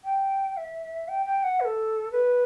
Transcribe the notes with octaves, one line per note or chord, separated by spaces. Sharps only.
G5
E5
G5
G5
F#5
B4
A4
B4